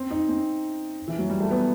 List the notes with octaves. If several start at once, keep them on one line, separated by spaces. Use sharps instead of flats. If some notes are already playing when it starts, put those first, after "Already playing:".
Already playing: C4
D#4
C4
E3
F#3
G3
A3
B3